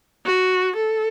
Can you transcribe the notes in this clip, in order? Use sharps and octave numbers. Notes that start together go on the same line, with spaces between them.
F#4
A4